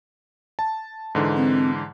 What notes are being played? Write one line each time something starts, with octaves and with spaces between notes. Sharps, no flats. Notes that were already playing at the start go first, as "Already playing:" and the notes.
A5
G#2 D3 E3
C4